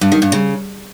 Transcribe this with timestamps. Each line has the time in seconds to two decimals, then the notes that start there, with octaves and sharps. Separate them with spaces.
0.01 G2
0.12 D#3
0.22 G2
0.32 C#3